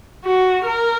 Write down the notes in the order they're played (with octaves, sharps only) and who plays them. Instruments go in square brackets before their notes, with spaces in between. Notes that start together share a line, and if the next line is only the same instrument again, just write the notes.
[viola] F#4
A#4